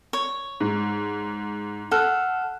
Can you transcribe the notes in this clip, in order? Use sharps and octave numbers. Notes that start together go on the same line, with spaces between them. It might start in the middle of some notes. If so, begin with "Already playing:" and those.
C#5
G#2
A4 F#5 F6 F#6